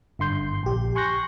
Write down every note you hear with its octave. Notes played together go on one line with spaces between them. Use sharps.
G1 D3 C6 G6
A#1 G4
G#5 C6 C#6 F#6 G6 A#6